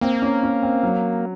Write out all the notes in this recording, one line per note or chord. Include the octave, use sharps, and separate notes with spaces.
A#3 C4
C#4
C#4
C4
F#3